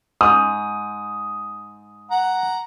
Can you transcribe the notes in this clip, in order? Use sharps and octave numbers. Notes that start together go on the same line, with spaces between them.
G#2 D#6
F#5 A#5